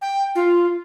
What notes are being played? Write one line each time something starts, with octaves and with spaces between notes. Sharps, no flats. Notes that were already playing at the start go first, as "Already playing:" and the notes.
G5
F4